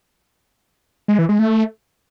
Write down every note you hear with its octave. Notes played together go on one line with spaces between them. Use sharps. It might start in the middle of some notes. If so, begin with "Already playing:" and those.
G#3
E3
G#3
A3